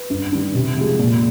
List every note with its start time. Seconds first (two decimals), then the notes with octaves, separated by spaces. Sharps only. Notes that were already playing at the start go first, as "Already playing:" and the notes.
Already playing: B4
0.10 G2
0.32 D#3 G3
0.54 C3
0.77 F3 G#3
0.99 A#2